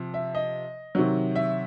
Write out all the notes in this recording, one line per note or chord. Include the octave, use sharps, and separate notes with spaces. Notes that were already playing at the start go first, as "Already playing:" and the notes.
Already playing: C3 F3
E5
D#5
C3 D#3 F#3
E5